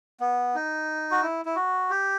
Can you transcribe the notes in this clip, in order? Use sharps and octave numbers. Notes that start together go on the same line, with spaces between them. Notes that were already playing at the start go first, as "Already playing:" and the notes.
B3
D#4
F#4
E4
E4
F#4
G4